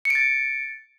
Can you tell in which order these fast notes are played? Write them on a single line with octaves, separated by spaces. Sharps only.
C#7 D7 A6